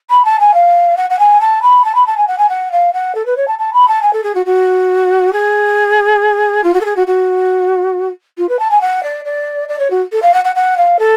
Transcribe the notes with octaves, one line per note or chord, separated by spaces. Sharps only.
B5
A5
G#5
F5
F#5
F#5
G#5
A5
B5
A5
B5
A5
G#5
F#5
G#5
F#5
F5
F#5
A4
B4
C#5
A5
A5
B5
A5
G#5
A4
G#4
F#4
F#4
G#4
F4
F#4
A4
G#4
F#4
F#4
F4
B4
A5
G#5
F#5
D5
D5
D5
C#5
F#4
A4
F5
F#5
F#5
F#5
F5
A4